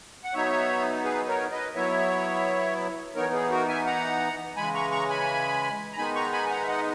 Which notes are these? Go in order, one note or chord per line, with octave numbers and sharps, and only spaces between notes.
F#5
F#3 B3 D#4 C#5 E5
G#4 B4
A#4 C#5
B4 D#5
F#3 B3 E4 C#5 E5
E3 B3 D#4 A#4 C#5
G#4
F#4 A#4
E5 G#5
F#5 A#5
C#3 E3 G#3 G#5 B5
A#5 C#6
A#5 C#6
G#5 B5
A#5
D#3 G#3 B3 D#4 G#5 B5
A#5 C#6
G#5 B5
G#5
F#5 A#5
E5
D#5 F#5